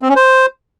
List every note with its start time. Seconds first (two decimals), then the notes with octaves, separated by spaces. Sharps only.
0.02 C4
0.09 C#4
0.16 C5